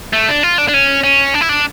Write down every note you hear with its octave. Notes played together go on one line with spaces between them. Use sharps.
A3
D4
F4
D4
D4
C#4
C#4
D4
E4
D4